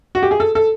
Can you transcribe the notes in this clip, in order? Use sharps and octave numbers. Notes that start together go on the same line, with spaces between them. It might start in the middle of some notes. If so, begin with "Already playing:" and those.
F#4
G4
G#4
A4
A4